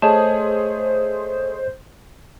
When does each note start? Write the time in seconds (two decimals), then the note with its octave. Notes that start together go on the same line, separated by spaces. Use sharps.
0.02 A3 G#4 C5 C#5 D#5 A5